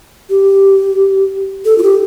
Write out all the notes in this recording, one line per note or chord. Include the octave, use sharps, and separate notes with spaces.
G4
A4
F4
G4